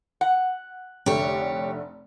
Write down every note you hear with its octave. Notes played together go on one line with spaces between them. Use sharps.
F#5
F1 D3 A3 G4 C#5